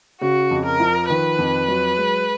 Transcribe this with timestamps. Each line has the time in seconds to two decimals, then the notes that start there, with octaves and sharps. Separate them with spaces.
0.21 C#3 F#4
0.51 F2
0.66 A#4
0.80 F3
1.10 D#3 B4
1.38 F2
1.68 F#3
1.98 G#3